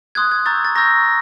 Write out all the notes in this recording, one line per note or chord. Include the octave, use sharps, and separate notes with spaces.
C6 D#6 F#6 G#6
G#6
A#5 C#6 E6 G6 A6
A6
A#5 C#6 E6 G6 A#6